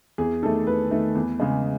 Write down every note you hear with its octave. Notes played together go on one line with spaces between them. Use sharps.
E2 G#4
D#3 A3 A4
E2 B4
D#3 A3
E2
C#3 G#3